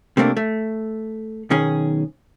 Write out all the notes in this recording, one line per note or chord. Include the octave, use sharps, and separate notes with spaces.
C3 A3 A#3 D4
A3
B1 D#3 C#4 G#4